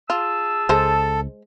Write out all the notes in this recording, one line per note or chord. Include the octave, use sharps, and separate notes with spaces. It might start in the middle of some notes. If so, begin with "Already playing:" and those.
F4 G#4 A5 E6
C#2 G#3 A4 C5